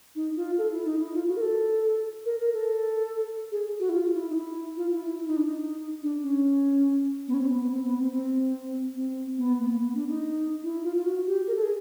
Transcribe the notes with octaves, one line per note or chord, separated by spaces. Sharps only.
D#4
F4
A4
E4
D#4
E4
F4
F#4
A#4
A4
A#4
A#4
A4
G#4
F#4
E4
F4
E4
D#4
E4
F4
E4
E4
E4
D#4
D4
D#4
D4
C#4
B3
C#4
C4
B3
B3
C4
B3
C4
C4
C4
B3
A#3
A#3
B3
D4
D#4
E4
F4
F4
F#4
G4
A#4
A4
G#4